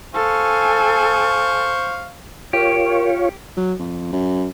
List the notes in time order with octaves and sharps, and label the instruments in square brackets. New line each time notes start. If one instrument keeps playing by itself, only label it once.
[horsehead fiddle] A4 G#5 [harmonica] C5 F5 C#6
[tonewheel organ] F4 C#5 [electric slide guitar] G4 [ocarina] A#4
[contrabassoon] F#3
F2
F#2